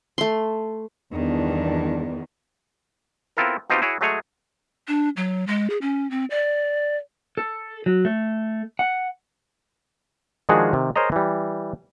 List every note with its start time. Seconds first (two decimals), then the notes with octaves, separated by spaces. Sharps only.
0.18 A3 C6
1.13 E2 G2 D#3 D4
3.37 B3 C4 E4 F4 A4 A#4
3.70 B2 C4 D#4 F4 G4
3.82 E4 F#4 G#4 C#5
4.01 F#3 G#3 A3 G#4 C#5
4.88 D4
5.16 F#3
5.47 G#3
5.70 G#4
5.81 C#4
6.11 C4
6.30 D5
7.37 A4
7.86 F#3
8.05 A3
8.79 F#5
10.49 D#3 F3 G#3 D4 F#4 G#4
10.73 C3 D#3
10.96 G#4 A#4 C5 C#5 D#5 A#5
11.12 E3 G3